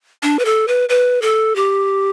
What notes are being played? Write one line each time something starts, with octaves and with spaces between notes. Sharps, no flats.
D4
B4
A4
B4
B4
A4
G4